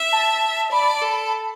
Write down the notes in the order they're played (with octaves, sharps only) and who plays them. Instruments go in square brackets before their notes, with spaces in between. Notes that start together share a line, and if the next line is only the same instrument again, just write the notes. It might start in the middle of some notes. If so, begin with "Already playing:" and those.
Already playing: [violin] E5
[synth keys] A5
[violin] D5 [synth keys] B5
[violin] A4